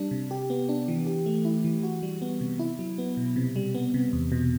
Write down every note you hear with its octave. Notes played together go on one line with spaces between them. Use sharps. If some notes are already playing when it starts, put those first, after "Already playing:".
Already playing: G3 D4
C3
G4
B3
D4
E3
G4
A3
E4
E3
F#4
G3
B3
C3
E4
F#3
B3
B2
C3
G3
B3
C3
E2
B2